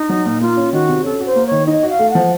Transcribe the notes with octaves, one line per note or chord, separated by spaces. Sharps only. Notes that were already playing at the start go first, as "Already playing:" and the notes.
Already playing: D#4
F#3
A#2
A#3 F4
C#4
D#3 F#4
C3
C#4 A4
F#4
C5
A#3
C#5
D#3
D#4 D#5
F#4
F5
A3
F#5
F3